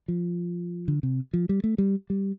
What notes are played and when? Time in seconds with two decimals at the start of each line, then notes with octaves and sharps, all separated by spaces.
0.08 F3
0.88 D3
1.03 C3
1.33 F3
1.49 G3
1.64 A3
1.78 G3
2.10 G3